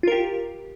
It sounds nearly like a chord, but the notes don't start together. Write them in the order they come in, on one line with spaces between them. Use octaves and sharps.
F4 A#4 G4